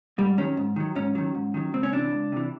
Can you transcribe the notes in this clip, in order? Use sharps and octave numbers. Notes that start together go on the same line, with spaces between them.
G#2 G3
D#3 F#3 C#4
G#2
D#3 F#3
G#2 C#4
D#3 F#3
G#2
D#3 F#3
C#2 C4
C#4
C3 E3 D4
C#2
C3 E3